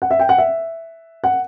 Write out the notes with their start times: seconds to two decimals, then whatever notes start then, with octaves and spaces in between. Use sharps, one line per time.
0.02 F#5
0.11 E5
0.19 G5
0.29 F#5
0.38 E5
1.24 F#5